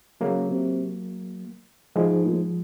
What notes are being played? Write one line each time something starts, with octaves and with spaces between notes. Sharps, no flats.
C#3 F#3 A#3
C3
G#2 F3 G#3
A#2
G#2